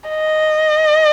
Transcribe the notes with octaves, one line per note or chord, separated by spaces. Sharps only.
D#5